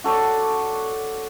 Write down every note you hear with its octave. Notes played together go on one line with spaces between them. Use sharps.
F#4 A4 C#5 D5